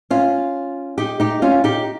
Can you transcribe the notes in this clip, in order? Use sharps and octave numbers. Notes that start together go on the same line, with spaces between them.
C#4 F4
D#4 G4
D#4 G4
C#4 F4
D#4 G4